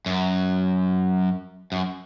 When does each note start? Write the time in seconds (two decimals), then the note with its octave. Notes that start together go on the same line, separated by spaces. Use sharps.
0.06 F#2
1.72 F#2